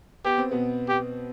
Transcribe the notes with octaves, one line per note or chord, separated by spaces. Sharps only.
B3 G4
C4
B2 B3
G4